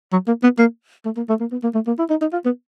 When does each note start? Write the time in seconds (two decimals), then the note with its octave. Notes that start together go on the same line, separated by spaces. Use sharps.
0.12 F#3
0.27 A#3
0.43 B3
0.58 A#3
1.05 A3
1.17 A#3
1.29 A3
1.40 A#3
1.52 B3
1.63 A#3
1.75 A3
1.87 A#3
1.99 E4
2.10 D#4
2.21 D#4
2.33 F4
2.45 B3